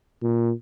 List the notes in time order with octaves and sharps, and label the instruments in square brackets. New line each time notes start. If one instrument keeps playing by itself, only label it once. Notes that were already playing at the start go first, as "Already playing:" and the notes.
[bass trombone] A#2